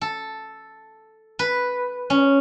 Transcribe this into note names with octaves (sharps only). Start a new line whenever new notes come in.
A4
B4
C#4